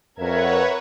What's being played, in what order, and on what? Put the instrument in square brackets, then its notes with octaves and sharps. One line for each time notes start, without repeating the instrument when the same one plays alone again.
[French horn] F2 [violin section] A#4 E5 G#6 [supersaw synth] B4 C#5 F#5